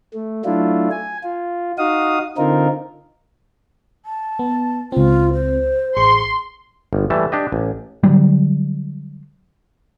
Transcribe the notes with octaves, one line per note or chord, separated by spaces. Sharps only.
A3
F#3 A3 D4 E4 F4
G#5
F4
D#4 F#4 F5 D#6
D3 C4 D#4 F4 A#4
A5
B3
C#2 C4 F4
C5
A1 G#4 C6 C#6
G1
E3 G3 A3 A5
D4 G4 D#5
A1
D3 F#3 G3